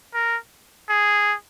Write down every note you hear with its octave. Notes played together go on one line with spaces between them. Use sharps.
A#4
G#4